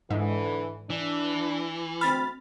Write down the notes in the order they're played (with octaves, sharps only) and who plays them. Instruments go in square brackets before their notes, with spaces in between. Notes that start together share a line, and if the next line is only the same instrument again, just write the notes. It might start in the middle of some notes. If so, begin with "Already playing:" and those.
[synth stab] G#2 [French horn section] D3 E3
[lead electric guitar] E3 [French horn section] D4
[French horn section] D2 C4 [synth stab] B5 F6 A6